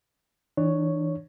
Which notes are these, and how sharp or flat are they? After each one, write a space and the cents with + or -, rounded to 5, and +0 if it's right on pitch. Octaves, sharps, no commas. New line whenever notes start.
E3 -20 D4 +25 C#5 +0